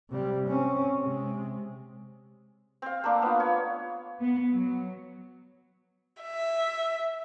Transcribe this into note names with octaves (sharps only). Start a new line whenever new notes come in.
C3 G3
C4 C#4
C3 G#3
C4 F5
A3 A#3 D4
B3 F4
C#5
B3
F#3
E5